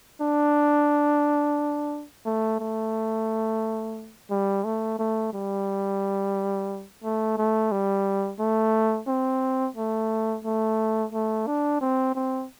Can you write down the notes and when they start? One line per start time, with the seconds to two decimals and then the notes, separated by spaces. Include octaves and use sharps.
0.21 D4
2.25 A3
2.60 A3
4.30 G3
4.64 A3
4.99 A3
5.33 G3
7.03 A3
7.37 A3
7.71 G3
8.39 A3
9.08 C4
9.76 A3
10.45 A3
11.13 A3
11.47 D4
11.81 C4
12.15 C4